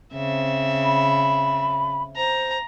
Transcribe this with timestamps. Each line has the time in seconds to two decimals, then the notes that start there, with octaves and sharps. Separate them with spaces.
0.15 C#3 C4 E5
0.81 B5
2.16 C5 A#5